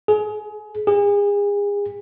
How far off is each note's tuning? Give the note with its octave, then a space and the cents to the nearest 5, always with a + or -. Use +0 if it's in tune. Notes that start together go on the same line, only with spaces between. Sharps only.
G#4 +25
G#4 -35